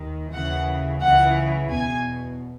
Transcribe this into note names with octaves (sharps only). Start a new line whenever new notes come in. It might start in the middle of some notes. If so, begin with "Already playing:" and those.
Already playing: D#2 D#3
D#2 C#3 E3 F#5
C#2 C#3 E3 F#5
E2 B2 G#5